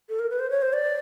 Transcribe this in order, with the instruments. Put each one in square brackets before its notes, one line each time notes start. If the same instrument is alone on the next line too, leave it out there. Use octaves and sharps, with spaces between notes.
[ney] A4
A#4
B4
C5
C#5
C5
D5